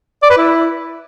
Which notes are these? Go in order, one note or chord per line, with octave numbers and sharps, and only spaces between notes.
D5
B4
E4